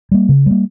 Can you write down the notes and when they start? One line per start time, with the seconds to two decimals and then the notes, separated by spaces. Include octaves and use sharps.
0.12 G3 A#3
0.29 C#3
0.46 G3 A#3